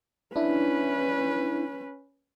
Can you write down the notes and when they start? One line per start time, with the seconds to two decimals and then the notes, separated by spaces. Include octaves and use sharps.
0.36 C#4 D4 E4 B4